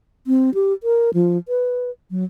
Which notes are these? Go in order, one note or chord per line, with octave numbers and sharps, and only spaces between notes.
C4
G4
A#4
F3
B4
F#3